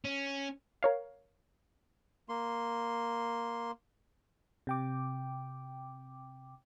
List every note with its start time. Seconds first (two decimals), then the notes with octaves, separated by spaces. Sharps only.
0.05 C#4
0.83 A#4 C#5 F5
2.29 A#3 C6
4.67 C3 G5 D6